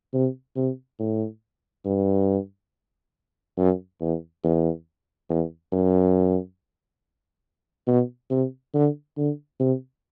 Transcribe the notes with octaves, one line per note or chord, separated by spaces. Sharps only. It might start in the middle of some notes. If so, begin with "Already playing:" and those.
C3
C3
A2
G2
F#2
E2
E2
E2
F#2
B2
C3
D3
D3
C3